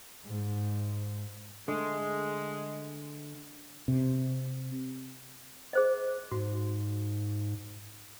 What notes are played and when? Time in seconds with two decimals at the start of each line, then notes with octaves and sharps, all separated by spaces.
0.25 G#2
1.68 D3 G#3 A3 D4
3.88 C3
5.73 G#4 C5 D#5
6.32 G#2 F#4